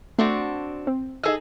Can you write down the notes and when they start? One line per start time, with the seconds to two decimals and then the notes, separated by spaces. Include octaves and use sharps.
0.19 A3 C4 D4 F#4
0.87 C4
1.23 D#4 G#4 A4 D#5 E6